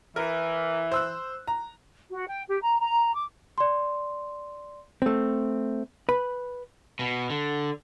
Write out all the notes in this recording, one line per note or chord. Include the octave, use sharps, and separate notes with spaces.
E3 A#4
C5 E6 F#6
A#5
F#4
G5
G4
A#5
A#5
D6
D5 C6
A3 C4
B4 B5
B2
D3